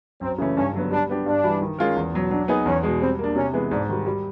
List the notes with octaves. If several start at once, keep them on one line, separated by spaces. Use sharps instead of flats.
F#2 C4
C#3 E3 A3 C#4
G2 C#4
D3 F#3 B3
G3 D4
B3 D4 G4
G2 D4
E3 G3
D#3
G#3 C#4 F4 A#4
E2
B2 F#3
F#3 D4
B3 D#4 G#4 B4
E2 C#4
B2 G#3
G3 C4
A#3 D4
C3 C#4
E3 G#3 B3
G#2 D4
D#3 G3
G3